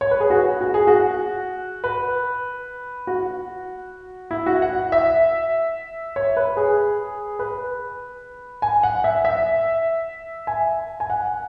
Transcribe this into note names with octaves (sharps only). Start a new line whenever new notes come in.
C#5
B4
G#4
F#4
F#4
G#4
F#4
B4
F#4
E4
F#4
F#5
E5
C#5
B4
G#4
B4
G#5
F#5
E5
E5
G#5
G#5
F#5